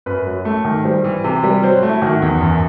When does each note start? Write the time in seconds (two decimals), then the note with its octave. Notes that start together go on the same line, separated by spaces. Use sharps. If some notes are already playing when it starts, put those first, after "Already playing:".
0.06 F#2 B4
0.26 F#3
0.45 A3
0.65 D#3
0.84 G3 C5
1.04 E3
1.24 C3
1.44 G3
1.63 F#3 C5
1.83 A3
1.89 E4
2.02 D#3 F#4
2.22 E2
2.41 F#2